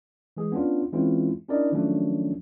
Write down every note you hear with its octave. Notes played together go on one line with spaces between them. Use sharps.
E3 G#3 G#4
B3 C#4 D4 F4
E3 G#3 C4 C#4 E4 F4
C#4 D4 E4 A#4 D5 D#5
D#3 F3 F#3 A3 C#4 D4